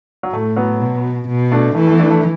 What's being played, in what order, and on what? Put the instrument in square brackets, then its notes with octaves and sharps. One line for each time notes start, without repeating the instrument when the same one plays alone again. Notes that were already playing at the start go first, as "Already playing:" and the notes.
[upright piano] F#3
[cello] A2 [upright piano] A3
[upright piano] F#3 B3
[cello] B2
B2
[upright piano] A3 D4
[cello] E3 [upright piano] A3
[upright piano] A3
B3
A3 D4
A3 D4